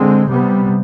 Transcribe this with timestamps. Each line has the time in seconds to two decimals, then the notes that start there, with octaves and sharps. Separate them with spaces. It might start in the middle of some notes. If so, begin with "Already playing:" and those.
Already playing: D3 G#3 C4
0.28 C3 G3 B3